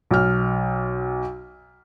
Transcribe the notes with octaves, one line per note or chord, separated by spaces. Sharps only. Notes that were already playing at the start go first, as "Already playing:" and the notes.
B1 F6